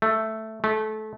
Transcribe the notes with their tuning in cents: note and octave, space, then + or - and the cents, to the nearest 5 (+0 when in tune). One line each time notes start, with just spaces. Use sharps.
A3 +0
A3 -25